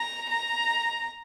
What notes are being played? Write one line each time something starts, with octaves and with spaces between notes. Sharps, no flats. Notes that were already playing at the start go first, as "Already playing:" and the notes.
Already playing: A#5
A#5